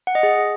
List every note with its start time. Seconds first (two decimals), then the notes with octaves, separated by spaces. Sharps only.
0.07 F#5
0.15 D#5
0.23 G#4